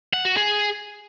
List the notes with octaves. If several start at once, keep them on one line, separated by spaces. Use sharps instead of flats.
F#5
F#4
G#4